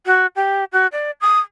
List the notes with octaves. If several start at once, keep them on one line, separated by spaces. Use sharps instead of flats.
F#4
G4
F#4
D5
D#6